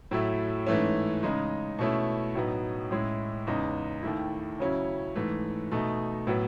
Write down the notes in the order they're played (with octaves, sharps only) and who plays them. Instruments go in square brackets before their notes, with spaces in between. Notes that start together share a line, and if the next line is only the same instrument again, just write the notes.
[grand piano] A2 F#3 A3 E4
G#2 E3 A3 C#4
C#3 G#3 D#4
B2 A3 C#4 E4
A2 F#3 B3 D#4
A2 G#3 C#4 E4
E2 C#3 G#3 D#4
D#2 D#3 A3 E4
C#3 F#3 C#4 E4
G#2 E3 A3
B2 A3 D#4
A2 F#3 B3